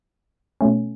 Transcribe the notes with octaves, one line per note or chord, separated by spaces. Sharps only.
B2 A3 C#4